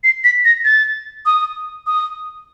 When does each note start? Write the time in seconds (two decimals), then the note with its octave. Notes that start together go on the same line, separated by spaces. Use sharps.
0.04 C7
0.24 B6
0.45 A#6
0.64 A6
1.26 D#6
1.86 D#6